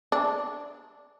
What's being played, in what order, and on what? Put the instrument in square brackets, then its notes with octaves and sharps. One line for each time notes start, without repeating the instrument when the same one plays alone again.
[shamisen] D4